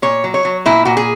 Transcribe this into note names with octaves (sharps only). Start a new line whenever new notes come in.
A#2 C#5
F#3
C#5
F#3
A#2 E4
A#2 F#4
G#4